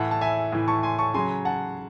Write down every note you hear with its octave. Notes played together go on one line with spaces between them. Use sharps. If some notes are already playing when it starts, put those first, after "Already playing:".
Already playing: A2 E3 F#5 A5
A5
E5 G#5
A2 E3
A5 C#6
G#5 C6
A5 C#6
C#3 F#3 G#5 C6
F#5 A5